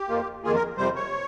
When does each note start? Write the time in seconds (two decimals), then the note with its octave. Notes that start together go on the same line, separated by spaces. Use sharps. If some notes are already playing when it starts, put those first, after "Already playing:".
Already playing: G4
0.09 F2 D#3 A#3 F4
0.43 F2 D#3 A#3 F4 G#4
0.55 A#4
0.78 F2 C3 G3 C5
0.96 C#5